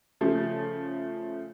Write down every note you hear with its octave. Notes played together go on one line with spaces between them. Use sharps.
C#3 F3 A3